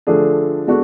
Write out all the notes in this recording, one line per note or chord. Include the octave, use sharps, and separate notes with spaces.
D3 F3 A3 D4 G#4
G#3 B3 D4 F#4 A4